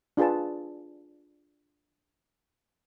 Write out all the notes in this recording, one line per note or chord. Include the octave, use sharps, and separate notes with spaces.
D4 F4 G#4 B4 A5